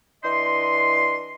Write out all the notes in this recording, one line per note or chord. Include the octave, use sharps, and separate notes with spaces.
E3 D4 D#5 C6